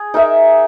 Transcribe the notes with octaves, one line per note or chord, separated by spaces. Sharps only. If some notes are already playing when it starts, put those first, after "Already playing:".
Already playing: G#4
D#4 A#4 E5